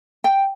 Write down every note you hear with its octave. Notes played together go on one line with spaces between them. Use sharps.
G5